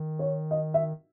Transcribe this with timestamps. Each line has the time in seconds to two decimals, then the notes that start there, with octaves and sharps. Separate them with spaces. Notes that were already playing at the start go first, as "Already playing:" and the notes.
Already playing: D#3
0.19 C#5
0.51 D#5
0.74 E5